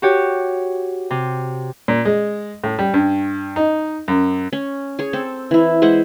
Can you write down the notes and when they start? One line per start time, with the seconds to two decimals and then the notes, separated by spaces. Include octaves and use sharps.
0.02 F#4 G4 C#5
1.10 C3
1.88 A#2
2.05 G#3
2.64 A2
2.79 G3
2.94 G2
3.56 D#4
4.08 F#2
4.53 C#4
4.99 G#4 C#5
5.13 C4 A4
5.51 E3 E4
5.82 G#3 E4 C5 F#5